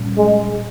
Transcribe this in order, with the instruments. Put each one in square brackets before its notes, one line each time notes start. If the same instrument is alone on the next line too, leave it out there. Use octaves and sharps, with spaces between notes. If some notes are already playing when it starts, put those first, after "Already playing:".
Already playing: [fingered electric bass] A#2 G3 C#4
[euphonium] G#3